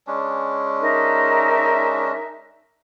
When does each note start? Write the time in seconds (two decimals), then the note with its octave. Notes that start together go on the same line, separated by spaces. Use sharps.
0.07 G#3 C#4 D4
0.81 D#4 A#4 E5